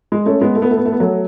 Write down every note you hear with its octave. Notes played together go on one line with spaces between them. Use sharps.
G#3
A3 C#4
G#3 B3
A3
B3
A3
B3
A3
B3
F#3 A3